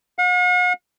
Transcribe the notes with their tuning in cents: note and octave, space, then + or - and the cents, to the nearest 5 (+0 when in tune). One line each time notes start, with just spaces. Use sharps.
F#5 -45